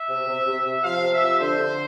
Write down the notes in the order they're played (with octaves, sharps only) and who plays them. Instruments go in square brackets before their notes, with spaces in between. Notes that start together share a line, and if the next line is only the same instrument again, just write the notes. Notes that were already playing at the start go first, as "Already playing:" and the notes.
Already playing: [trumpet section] E5
[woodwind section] C3
C3
C3
C3
[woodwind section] F3 [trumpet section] F5
[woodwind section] C3
[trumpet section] E5
[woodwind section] F3
[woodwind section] D3 [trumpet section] C5
[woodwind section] D3